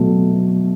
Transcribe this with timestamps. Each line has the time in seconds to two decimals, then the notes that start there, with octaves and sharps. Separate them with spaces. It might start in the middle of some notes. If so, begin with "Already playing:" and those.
Already playing: B2 F#3 A3